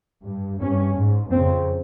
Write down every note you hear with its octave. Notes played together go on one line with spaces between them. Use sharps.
G2
G2 C#4
G#2
F2 C#3 C4